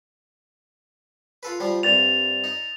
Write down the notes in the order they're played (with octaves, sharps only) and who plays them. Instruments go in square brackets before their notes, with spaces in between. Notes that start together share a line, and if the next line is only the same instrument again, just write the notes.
[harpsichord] F4 A4 B4
F3 G3 F4
[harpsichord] C2 G2 [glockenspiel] A6 F7
[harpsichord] D#4